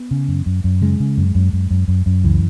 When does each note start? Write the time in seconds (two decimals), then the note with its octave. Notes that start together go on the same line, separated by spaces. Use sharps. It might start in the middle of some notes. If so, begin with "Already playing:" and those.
Already playing: B3
0.11 C#3
0.28 F#2
0.46 F#2
0.64 F#2
0.81 C#3 G#3
1.00 C#3
1.17 F#2
1.35 F#2
1.53 F#2
1.71 F#2
1.88 F#2
2.06 F#2
2.24 C#2 E3